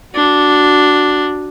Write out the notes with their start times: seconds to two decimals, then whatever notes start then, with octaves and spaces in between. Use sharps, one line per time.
0.14 D4 F#4